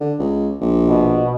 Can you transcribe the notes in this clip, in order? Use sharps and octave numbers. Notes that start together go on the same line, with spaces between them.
D3
C#2
A#1
B2